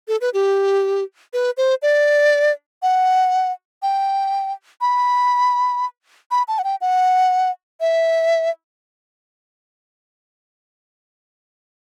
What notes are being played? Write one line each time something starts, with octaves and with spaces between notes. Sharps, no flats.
A4
B4
G4
B4
C5
D5
F#5
G5
B5
B5
A5
F#5
G5
F#5
E5